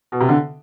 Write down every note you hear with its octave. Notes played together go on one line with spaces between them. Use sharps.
B2
C3
D3